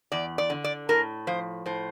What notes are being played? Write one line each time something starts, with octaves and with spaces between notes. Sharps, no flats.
E2 D5
D5
D3
D5
A2 A#4
F3 C5
A2 C5